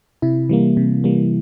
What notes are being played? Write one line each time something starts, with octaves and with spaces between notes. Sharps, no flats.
C3 E4
E3 G3 A#3
C3
E3 G3 A#3